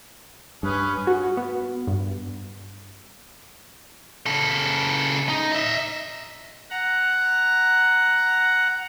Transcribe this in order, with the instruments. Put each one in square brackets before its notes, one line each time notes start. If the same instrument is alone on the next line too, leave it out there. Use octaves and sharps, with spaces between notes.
[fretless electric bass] G2 [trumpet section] C#4 G#4 B4
[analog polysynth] F#4
B3
G2
[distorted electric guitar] C#3 A4
D#4
D#5 E5
[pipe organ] F#5 A#5